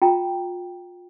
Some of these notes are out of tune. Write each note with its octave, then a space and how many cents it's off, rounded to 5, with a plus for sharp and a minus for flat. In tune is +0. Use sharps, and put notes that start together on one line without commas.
F4 +30 G5 +0 A#5 +5